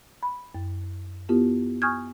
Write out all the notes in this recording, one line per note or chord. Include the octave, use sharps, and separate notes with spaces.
B5
F#2
B3 E4 F4 G4 A#4
G#5 C#6 D#6 F6 G6 G#6